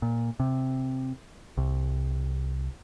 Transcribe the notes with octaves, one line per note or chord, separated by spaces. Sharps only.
A#2
C3
C2